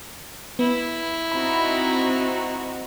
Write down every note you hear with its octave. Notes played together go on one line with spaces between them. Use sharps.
B3 E4
C4 D#4 F#4 B5